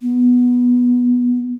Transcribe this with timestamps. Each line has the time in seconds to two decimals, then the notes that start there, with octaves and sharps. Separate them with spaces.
0.02 B3